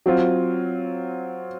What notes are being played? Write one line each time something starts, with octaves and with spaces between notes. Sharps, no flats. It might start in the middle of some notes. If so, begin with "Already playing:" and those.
F#3 C4 F4